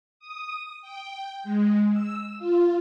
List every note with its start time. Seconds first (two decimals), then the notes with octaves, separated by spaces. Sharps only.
0.19 D#6
0.81 G5
1.44 G#3
1.91 E6
2.39 F4